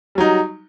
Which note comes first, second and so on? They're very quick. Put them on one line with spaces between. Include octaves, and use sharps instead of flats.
G3 F#3 D#4